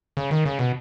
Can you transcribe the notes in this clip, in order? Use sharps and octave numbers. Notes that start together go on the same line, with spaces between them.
C#3
D#3
C#3
B2